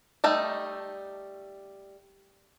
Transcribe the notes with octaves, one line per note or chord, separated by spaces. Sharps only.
G3 A3 D#4